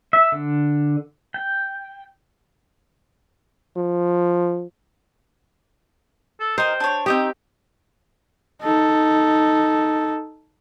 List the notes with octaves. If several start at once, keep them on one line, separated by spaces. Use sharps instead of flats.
E5
D3
G5
F3
A4
D#4 A#4 C5 G5
D4 C#5
C4 D#4 G4 G5 D#6
D#4 A4